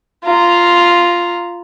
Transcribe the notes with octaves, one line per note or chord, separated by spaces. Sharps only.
F4 A#5